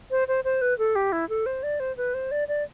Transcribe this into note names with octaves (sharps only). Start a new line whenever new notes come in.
C5
C5
C5
B4
A4
G4
E4
A4
C5
D5
C5
B4
C5
D5
D5